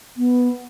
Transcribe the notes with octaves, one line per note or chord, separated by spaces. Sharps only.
B3